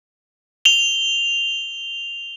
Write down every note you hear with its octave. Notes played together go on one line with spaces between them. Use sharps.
F7 G7